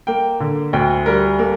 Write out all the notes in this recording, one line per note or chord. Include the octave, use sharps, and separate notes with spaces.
A#3 G5
D3
D2 G5
G3 A#4
A#3 A4